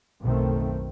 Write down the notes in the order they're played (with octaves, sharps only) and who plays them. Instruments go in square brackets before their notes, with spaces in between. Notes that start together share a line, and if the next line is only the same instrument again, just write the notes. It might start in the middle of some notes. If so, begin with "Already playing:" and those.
[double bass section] F#1 B1 B2 D#3 A3 C4